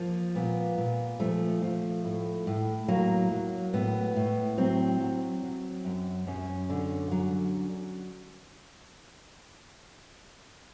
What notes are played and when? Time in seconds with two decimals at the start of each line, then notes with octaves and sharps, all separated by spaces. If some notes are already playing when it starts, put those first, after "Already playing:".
Already playing: F3 A#3
0.35 A#2 B3
0.77 A#2
1.20 F3 A3
1.62 F3
2.05 A2
2.47 A2
2.88 F#3 A#3
3.32 F#3
3.73 A2 B3
4.16 A2
4.58 F#3 C4
5.00 F#3
5.43 F#3
5.85 F#2
6.27 F#2 C#4
6.70 D3
7.12 F#3